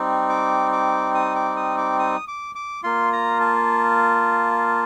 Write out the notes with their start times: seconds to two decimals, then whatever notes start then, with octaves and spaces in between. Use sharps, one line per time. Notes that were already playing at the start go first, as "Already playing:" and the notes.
Already playing: G3 C4 D#4
0.29 D6
0.72 D6
1.15 D#6
1.35 D6
1.56 D#6
1.78 D6
1.99 D#6
2.28 D6
2.55 D6
2.83 A#3 F4 C6
3.13 A#5
3.40 A5